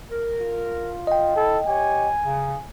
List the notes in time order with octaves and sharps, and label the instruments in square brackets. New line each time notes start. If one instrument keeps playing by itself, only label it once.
[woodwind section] A#4
[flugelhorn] F4
[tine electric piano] D#5 G5
[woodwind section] E4 [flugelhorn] A4
[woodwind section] G4 C#5 [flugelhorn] G#5
[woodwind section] C#3